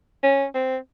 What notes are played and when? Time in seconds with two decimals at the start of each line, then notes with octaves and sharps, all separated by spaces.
0.23 C#4
0.55 C4